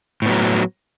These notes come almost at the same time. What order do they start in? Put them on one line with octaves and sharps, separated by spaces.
A2 B3 F#3